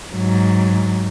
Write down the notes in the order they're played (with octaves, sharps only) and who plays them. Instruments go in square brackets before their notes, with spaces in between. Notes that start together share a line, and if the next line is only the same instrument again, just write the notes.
[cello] G#2 F#3